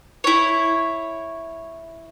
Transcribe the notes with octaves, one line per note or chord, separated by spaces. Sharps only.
E4 C#5